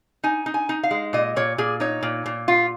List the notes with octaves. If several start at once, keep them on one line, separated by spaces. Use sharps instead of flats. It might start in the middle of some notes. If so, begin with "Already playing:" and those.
D#4 G#5
D#4
G#5
D#4
F5
G#3
A#2 D#5
A#2 C#5
A#2 G#4
D#4 C#5
A#2
A#2
F4